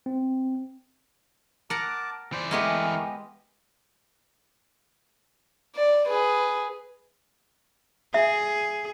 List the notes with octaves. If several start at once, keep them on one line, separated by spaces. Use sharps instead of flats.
C4
A#4 F#5 A5 D6
E3 C5 D5
G#3 A3 B3 G4 A#4
D5
G#4 B4
G#4 E5